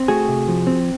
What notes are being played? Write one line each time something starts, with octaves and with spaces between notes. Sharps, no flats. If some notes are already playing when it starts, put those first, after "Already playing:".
Already playing: C4
A3 F#4 G#4
C3
F3
C4